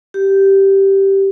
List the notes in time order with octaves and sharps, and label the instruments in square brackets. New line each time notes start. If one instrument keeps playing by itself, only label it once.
[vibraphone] G4